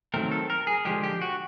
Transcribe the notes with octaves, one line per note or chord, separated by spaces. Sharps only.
D#3 F#3 A3 C4 A#4
A4
A#4
G#4
D3 F3 G#3 G4
G4
F#4